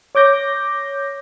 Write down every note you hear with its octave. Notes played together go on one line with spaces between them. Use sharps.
C#5 D6 G6 A#6